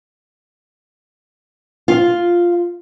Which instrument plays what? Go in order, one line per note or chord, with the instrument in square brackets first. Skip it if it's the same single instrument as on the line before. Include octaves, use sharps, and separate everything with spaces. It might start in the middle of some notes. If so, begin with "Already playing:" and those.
[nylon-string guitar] F4